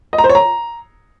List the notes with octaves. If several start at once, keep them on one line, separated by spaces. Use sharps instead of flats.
D#5
A#5
C5
C#5
A#5